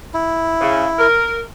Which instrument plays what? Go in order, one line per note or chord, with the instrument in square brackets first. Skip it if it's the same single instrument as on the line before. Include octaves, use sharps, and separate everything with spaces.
[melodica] E4
[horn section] C#3
A#4